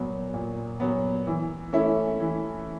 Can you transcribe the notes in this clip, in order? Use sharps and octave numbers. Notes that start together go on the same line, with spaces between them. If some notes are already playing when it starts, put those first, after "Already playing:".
Already playing: A#2 F#3 B3
A#2
F#3 B3
E3
A3 C#4 E4
E3